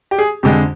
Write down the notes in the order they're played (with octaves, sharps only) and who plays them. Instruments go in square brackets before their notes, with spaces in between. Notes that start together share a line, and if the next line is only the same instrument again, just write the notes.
[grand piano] G4
G#4
F2 D3 G#3 G4